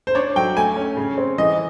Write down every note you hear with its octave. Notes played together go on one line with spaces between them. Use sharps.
C5
D4 C#5
F#3 G5
A3 G#5
C#4
C#3
C4
E3 D#5